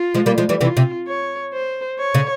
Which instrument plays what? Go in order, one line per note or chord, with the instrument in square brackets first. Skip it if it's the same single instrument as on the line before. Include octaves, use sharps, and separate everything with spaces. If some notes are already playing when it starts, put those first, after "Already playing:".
Already playing: [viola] F4
[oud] F3 G#3
G3 A#3
F3 G#3
E3 G3
[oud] C3 E3 [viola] F4
[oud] C3
[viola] C#5
C5
C#5
[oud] C#3